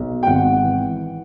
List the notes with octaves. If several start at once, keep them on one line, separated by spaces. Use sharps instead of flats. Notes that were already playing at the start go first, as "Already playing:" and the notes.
Already playing: B1
G5
G#1 F#5
E3